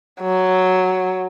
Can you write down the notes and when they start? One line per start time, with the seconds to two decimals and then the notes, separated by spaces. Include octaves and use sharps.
0.21 F#3